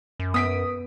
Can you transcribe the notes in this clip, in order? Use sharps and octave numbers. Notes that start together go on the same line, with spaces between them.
F#2
B3 D#6 B6 D7